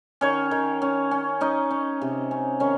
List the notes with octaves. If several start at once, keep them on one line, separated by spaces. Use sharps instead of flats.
D#3 C#4 C#5
D#3
C#4
C#4
C#4 D#4 D#5
C#4
C3
C#4
D#3 C#4 C#5